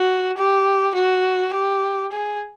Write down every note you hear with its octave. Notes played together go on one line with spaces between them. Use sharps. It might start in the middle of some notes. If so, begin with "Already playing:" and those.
Already playing: F#4
G4
F#4
G4
G#4